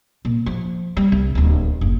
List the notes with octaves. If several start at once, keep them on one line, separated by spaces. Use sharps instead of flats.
A#2
F3
G3
C2
D1 D#2
F#1